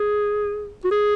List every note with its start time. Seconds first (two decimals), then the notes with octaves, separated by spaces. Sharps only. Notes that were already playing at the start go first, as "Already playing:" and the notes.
Already playing: G#4
0.85 F#4
0.91 G#4